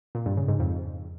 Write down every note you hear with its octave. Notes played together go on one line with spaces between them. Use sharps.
A#2
G2
C#3
G#2
F2